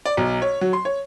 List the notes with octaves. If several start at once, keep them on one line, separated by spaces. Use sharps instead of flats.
D5
B1
C#5
F#3
C6
C#5